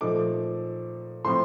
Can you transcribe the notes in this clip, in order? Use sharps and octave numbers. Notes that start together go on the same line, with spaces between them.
A#2 F3 A3 D#4 D6
A2 F3 C4 C6